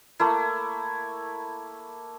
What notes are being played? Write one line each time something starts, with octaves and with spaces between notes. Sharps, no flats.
A3 A#3 E4